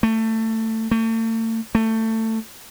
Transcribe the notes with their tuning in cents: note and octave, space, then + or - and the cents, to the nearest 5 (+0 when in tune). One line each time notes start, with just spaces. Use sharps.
A3 +20
A3 +40
A3 +20